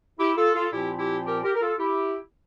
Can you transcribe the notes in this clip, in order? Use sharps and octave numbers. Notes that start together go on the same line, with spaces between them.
E4 G4
F4 A4
F4 A4
A#2 F3 C4 E4 G4
E4 G4
G4 A#4
G4 A#4
A#4
F4 A4
E4 G4